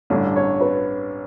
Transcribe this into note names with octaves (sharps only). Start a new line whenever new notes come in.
A1 G2 D3 C#5
C#5
B4